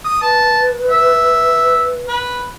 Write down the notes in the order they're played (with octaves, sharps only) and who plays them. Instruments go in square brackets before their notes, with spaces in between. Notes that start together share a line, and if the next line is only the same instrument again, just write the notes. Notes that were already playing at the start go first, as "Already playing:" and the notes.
[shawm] D#6
[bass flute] B4 [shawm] A5
[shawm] E5
B4